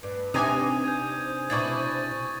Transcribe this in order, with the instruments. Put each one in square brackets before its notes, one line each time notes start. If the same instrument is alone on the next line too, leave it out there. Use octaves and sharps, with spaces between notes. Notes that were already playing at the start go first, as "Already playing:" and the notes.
[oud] G2 [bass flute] B4
[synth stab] C3 G#5 [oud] C4 D4 D#4 [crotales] D#6 D#7
[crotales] G6 G#6
[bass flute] C5
[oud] B2 D4 E4 [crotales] C#6 A6